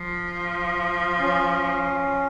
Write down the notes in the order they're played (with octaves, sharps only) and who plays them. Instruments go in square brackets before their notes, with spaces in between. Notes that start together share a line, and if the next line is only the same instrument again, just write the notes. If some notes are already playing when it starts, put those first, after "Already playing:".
Already playing: [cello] F3
[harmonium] C#4